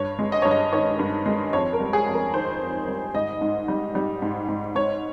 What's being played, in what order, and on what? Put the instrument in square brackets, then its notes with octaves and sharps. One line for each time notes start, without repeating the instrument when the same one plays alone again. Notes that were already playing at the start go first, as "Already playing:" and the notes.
Already playing: [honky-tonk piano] G2 C#5
G#3
D#5
G2 C#5
D#5
D#3 C#5
G2
G#3
F2 C#5
A#4
G3
G#4
F2
A#4
D#3 C5
F2
G3
G#2 D#5
G#2
G3
G3
G#2
G#2
G#2 C#5